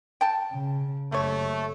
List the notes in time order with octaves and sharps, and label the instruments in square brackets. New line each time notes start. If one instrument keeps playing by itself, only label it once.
[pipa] G5 A5
[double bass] C#3
[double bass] F#1 [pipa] C3 C#5 [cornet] A3